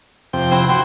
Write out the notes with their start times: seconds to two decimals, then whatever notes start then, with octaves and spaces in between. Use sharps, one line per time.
0.33 F2 C3 G5
0.51 C4 E4 F#4
0.69 C4 F#4 G5 C6